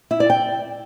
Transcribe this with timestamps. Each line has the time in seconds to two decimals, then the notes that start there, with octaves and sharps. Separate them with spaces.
0.11 E4
0.20 D5
0.30 G5